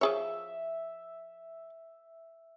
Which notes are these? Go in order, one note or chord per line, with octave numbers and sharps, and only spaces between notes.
F3 G#4 C#5 E5